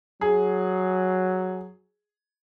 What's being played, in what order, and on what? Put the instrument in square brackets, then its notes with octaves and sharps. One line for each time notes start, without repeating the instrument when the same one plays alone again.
[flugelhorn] F#3 [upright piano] G#4